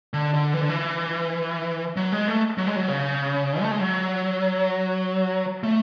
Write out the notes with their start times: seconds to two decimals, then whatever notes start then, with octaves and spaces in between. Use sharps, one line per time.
0.14 D3
0.34 D3
0.54 E3
0.61 D3
0.69 E3
1.97 F#3
2.12 G#3
2.27 A3
2.58 F#3
2.67 G#3
2.76 F#3
2.88 C#3
3.62 A3
3.71 G#3
3.80 F#3
5.63 A3